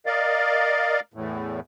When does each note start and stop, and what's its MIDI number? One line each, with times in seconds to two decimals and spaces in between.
0.06 1.00 70
0.06 1.00 74
0.06 1.00 75
0.06 1.00 77
1.14 1.60 40
1.14 1.60 45